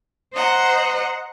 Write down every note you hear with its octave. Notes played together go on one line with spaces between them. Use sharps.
C5 D#5 F#5 A#5